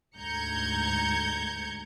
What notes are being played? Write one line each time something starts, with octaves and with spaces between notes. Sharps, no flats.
D2 G#2 A#5 G6 G#6 C#7